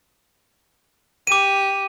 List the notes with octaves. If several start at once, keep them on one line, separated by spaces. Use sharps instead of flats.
G4 D6 D#7